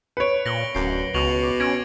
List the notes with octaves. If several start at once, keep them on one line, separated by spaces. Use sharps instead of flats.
B4 C#5 C#7 D7
A#2 A#6 F#7 G7
D1 F#2 C7
C#2 B2 C#6 F7 F#7
D6 F7
C#4 G#6 A#6 D7